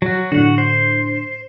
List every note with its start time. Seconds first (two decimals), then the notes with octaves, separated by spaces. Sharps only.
0.02 F#3 F#4
0.32 A2 D3 F#4 F#5
0.58 C5